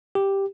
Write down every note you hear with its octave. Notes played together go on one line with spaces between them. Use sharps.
G4